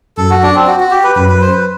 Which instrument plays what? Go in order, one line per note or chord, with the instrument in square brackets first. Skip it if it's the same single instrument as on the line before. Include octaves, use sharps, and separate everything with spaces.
[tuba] F#2 [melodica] A4
[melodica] F#4
D4
C4
F#4
F#4
G4
B4
[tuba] F#2 [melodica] B4
[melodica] B4
C5
B4